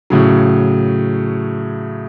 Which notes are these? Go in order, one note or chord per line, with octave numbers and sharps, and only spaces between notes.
A2 C#3 F#3